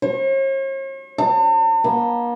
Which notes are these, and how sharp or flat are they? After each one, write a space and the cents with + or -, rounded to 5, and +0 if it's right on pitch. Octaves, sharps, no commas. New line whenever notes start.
C#5 -45
A5 +45
A#3 +40